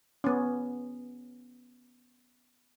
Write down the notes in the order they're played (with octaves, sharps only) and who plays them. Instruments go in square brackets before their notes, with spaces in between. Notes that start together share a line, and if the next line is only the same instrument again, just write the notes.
[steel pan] B3 C#4